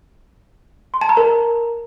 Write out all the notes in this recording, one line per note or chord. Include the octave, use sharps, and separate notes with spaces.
C6
A5
A#5
A#4